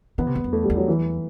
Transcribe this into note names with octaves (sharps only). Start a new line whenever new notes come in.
E3 B3
C3
E2
F#2
E2 A3
G3
E2
F#3
E3